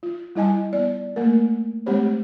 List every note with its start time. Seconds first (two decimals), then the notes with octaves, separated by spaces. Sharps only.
0.03 F4
0.35 G3 E4 D#5 G#5 A5
0.72 B3 D5
1.16 A3 A#3 A#4
1.86 G#3 A3 C4 G4 C5 C#5